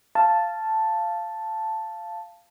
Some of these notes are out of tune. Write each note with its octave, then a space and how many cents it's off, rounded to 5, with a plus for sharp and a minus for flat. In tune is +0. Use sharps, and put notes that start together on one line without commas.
F5 -15 A5 +0